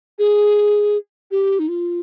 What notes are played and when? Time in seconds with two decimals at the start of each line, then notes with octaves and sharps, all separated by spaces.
0.19 G#4
1.31 G4
1.59 D#4
1.68 F4